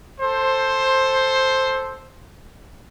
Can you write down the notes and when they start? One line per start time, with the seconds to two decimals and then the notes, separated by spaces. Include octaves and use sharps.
0.20 A4 C5